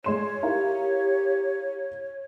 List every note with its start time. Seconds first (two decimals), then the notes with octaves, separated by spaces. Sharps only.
0.04 G#3 C#5 C6 E7
0.43 E4 G4 A#4 F5